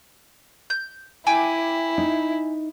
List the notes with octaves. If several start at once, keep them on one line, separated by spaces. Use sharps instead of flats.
G6
E4 G5 G#5 D6
D#4